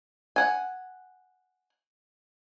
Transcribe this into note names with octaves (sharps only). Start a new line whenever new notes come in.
F#5 G#5